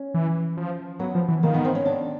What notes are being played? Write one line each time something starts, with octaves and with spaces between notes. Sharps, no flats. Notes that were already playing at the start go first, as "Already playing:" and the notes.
Already playing: C#4
E3
F3
F#3 B3
F3
E3
D#3 A#3
B3
C4
C#4
D4